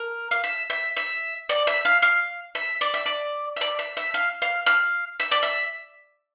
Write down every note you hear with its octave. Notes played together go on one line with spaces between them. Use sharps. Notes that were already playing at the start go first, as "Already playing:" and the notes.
Already playing: A#4
F5
E5
E5
E5
D5
E5
F5
F5
E5
D5
E5
D5
E5
D5
E5
E5
F5
F5
F5
E5
D5
E5